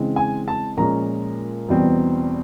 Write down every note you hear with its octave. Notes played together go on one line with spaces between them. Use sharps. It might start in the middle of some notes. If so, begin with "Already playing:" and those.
Already playing: C#3 E3 G#3 C4
G#5
A5
A#2 F3 G#3 C#4 A#5
E2 B2 G3 C4